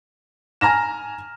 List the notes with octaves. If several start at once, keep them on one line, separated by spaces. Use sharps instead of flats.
G#5 A#5 F6 A#6 E7